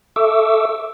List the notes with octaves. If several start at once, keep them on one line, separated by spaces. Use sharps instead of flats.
A4 E5 C#6 D6 E6